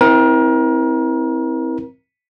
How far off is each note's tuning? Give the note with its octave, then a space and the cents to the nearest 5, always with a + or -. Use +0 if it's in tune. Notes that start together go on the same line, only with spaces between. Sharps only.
C4 +0 E4 -25 A#4 +30